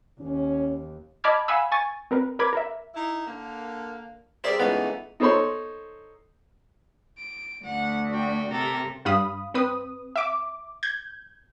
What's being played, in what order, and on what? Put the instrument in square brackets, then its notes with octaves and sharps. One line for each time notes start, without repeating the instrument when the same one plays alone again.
[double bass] D#2 [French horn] C#4
[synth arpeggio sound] D#5 A5 B5 D6 F6 G#6
F5 F#5 G#5 B5 E6
G#5 C#6 A6
C4 A#4 B4
A#4 B4 B5 D6 G#6
A#4 E5
[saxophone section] D#4 E4
D3 A#3
[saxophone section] G3 C4 D5 [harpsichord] G#4 A#4 E5 [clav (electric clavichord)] C5
[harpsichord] C#2 F5 A#5 [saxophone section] E3 A3 D#4 [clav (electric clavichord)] B3
[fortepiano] D#4 A4 C5 C#5 B5 C6
[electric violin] D7
[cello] D2 [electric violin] F#5
[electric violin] F#4 G5
[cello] C3 [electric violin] A4 A#4
[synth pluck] G2 F5 B5 D#6
C4 B4 D#6
E5 D6
G6 G#6